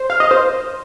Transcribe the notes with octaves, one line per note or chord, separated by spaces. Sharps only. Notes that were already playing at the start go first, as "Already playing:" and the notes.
Already playing: C5
F5
D#5
C5